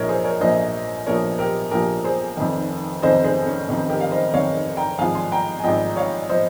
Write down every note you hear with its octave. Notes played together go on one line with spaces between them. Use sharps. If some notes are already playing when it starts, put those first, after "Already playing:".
Already playing: A#1 A#2 F3 D#4 A#4 C#5 D#5
G#4 C5
A#4 C#5
A#1 A#2 F3 C5 D#5
A#1 A#2 F3 A#4 C#5
G4 A#4
A#1 A#2 F3 G4 A#4
G#4 C5
F1 F2 D#3
F1 F2 D#3 C5 D#5
G#4 C5
C#4
F1 F2 D#3 D#4
G4 A#4
F5
C5 D#5
F1 F2 D#3 C#5 F5
G5 A#5
G#1 G#2 F3 F5 G#5
G#5 C6
G5 A#5
G#5
G#1 G#2 F3 D#5 G5
C#5 F5
F3 C5 D#5